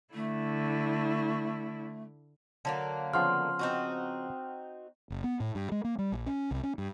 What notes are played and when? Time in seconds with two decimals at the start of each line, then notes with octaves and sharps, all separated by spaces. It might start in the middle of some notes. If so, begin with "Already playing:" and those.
0.14 D3 A3 E4
2.65 D3 F#3 A#3
3.13 C#3 F3 B3 F#5 C6 F6
3.59 C4 D#4 F#4
5.10 F#1
5.24 B3
5.40 A2
5.55 G2
5.72 G#3
5.84 A#3
5.98 G3
6.12 A#1
6.26 C#4
6.51 C2
6.63 C#4
6.78 G2